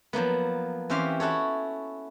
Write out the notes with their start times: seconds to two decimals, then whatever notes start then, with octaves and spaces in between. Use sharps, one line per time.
0.13 F3 F#3 A#3 B3
0.90 E3 C4 C#4 G4 F5 C6
1.20 E4 F#4 A4 C#5